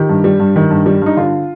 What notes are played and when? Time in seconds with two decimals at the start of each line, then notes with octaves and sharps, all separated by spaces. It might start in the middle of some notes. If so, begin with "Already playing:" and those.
Already playing: D#3 G4
0.09 G2
0.24 G3
0.40 G2
0.56 D#3
0.70 G2
0.86 G3
1.02 G2 D#4
1.17 D3 F4